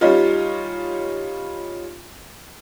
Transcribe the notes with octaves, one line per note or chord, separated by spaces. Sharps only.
G3 C#4 D#4 F4